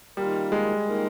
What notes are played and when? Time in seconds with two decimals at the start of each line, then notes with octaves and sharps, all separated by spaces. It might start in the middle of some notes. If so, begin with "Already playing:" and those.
0.17 D#3 G3 A#3 F4 A#4
0.52 G#3
0.85 D#3 A#3 F4 A#4